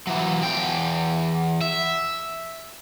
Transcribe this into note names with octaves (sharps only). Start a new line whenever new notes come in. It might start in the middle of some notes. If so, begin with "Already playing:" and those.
E3 F#3
E2 G5
E5